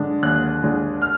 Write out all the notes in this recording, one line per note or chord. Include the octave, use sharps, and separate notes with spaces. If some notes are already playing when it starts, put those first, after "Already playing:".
Already playing: D3 G#3 D4
D#2 F#6
D3 G#3 D4
F6